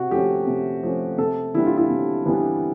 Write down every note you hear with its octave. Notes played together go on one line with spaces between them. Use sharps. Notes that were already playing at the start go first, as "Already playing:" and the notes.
Already playing: C3 F#4
F3 A3 C#4 G4
C3
F3 A3 C#4
C3 A4
E3 G3 B3 D4 E4
F4
E4
C3
E3 G3 B3 D4